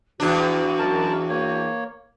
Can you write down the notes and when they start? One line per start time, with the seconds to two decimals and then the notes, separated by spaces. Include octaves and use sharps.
0.20 E2 D4 F#4
0.79 F#2 A#4 A5
1.29 A#3 C#5